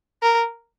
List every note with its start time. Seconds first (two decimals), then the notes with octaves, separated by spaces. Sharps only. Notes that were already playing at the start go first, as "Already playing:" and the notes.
0.22 A#4